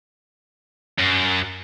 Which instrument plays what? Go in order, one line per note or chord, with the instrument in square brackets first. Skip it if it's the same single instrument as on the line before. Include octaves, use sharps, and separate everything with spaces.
[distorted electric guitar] F#2